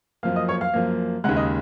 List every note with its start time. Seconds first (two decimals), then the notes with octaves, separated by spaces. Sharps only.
0.23 F#2 F3 A#3 F5 F6
0.36 D#5 D#6
0.49 C#5 C#6
0.61 F5 F6
0.74 F#2 F3 A#3
1.24 D#2 C#3 G#3 F#5 F#6
1.37 D#5 D#6